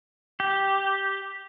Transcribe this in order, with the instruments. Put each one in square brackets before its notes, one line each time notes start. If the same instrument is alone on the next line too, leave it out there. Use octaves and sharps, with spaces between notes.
[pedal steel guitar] G4